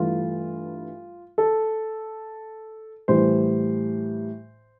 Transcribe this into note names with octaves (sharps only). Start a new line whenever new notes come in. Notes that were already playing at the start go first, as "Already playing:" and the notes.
Already playing: G2 E3 A3 F4
A4
A2 E3 G3 C5